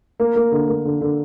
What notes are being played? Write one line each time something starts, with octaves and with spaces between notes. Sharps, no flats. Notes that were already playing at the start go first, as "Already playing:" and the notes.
A#3
A#3
D3
A#3
D3
D3